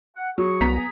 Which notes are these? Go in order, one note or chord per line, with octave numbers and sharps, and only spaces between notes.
F#5
F#3 G#4 C#6
C2 B3 A#5 B6
G#4